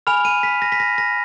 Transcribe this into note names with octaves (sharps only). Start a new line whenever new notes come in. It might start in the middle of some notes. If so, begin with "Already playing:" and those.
G#5 B5 F6 F7
D#7
B6
A#6
B6
A#6
A#6